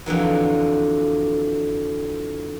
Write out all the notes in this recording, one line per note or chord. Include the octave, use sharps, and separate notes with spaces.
F2 D3 E3 F#3